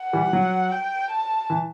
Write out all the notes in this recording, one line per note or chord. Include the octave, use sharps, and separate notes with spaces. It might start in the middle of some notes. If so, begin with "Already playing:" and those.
Already playing: F#5
E3 G3
F#3
G5
A5
E3